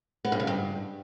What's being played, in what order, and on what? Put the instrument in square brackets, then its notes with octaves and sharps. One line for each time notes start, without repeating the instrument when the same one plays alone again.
[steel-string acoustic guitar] B3
G2
C#3
G2